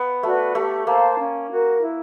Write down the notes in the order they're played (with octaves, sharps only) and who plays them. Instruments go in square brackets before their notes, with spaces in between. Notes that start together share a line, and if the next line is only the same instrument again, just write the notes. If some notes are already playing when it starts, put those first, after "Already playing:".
Already playing: [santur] B3
[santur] A3 [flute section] F#4 B4 D5
[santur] A3 [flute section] G4
[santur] A#3 [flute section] C5 F5 A5
[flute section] C#4
F#4 A#4
E4